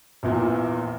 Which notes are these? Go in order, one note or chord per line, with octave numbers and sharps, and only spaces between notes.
A#1 E2 A#2